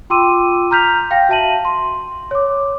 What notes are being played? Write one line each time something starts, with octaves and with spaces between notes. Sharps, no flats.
F4 G5 C6 D6 E6 D#7
A#5 F6 G6 B6 F7
F5 G5 A#6
F#4 E5 A5 D#7 F#7
C6
C#5 D6